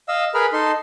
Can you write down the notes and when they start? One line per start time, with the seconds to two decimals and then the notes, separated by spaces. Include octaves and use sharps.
0.08 D#5 F5 E6
0.34 G#4 A#4 B4 B5 F6
0.53 D#4 A4 C6